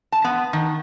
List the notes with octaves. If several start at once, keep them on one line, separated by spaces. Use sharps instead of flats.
A5
B3
D#3